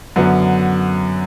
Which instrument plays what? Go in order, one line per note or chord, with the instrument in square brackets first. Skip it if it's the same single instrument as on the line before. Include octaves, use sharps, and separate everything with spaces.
[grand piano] F#2 D3 F#3 B3